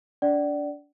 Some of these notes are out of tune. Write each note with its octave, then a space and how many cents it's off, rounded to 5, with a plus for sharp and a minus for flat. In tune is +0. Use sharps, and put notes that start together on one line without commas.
D4 -30 D5 +0 F#5 +40